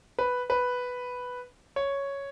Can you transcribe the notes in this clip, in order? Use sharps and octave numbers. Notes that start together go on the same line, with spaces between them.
B4
B4
C#5